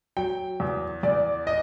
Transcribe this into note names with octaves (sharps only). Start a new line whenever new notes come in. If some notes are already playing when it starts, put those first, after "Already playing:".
F#3 G5
E2
E2 D5
D#5